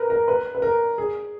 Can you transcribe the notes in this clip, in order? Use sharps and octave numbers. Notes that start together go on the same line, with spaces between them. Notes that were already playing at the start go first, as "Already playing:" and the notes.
Already playing: A#4 B4
A#4
B4
B4
A#4
G#4